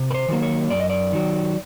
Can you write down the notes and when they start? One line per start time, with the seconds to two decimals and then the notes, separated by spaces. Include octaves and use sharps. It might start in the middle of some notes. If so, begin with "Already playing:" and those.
Already playing: C3
0.11 B4
0.14 C5
0.28 D#3 F#3 A#3
0.42 C#5
0.70 F#2 D5
0.80 D#5
0.90 D5
1.12 D#3 F#3